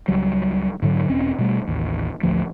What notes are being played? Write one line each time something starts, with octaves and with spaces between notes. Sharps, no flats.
C#2 F#3 G3
G#2 D3 F#3
E1 C4 C#4
B2 G3 A3
A1 D#2
A1 D2 F3 A3